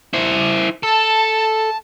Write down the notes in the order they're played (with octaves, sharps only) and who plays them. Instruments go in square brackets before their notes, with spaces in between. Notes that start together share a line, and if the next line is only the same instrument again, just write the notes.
[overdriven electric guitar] E4 C5
[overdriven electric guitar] A4 [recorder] A5